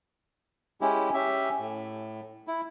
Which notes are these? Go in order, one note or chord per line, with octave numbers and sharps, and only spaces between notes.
G#3 C#4 E4 G4
C#4 G4 E5
A2
E4